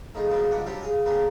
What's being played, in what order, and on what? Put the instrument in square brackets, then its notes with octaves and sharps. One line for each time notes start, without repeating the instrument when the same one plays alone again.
[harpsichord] A2 D#3 F3 G#4
A#2 C#3 F3 F#3 B3 F4
C#2 G2 D4 F#5 D6
F#3 G3 C4 D4 F4 G4
G#4 F5 G#5
C#3 A#3 B3 D4 G4 G#4